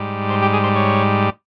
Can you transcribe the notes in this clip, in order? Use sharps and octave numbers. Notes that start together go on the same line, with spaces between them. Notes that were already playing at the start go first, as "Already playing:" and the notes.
Already playing: G#2 G3
C5
G4
G#4
C5
C#5